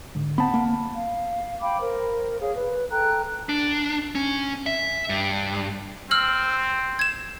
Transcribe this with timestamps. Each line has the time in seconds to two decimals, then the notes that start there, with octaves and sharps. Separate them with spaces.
0.15 G#2 D3
0.38 B3 C4 F#5 A5 B5
0.54 A#3
0.95 F5
1.62 F5 G5 B5 D6
1.81 A#4 C5
2.41 G#4 C#5 F5
2.55 B4
2.90 A4 G5 A#5 F#6
3.49 D4
4.15 C#4
4.66 E5
5.09 G2
6.11 C4 E6 F6 F#7
6.99 G#6 E7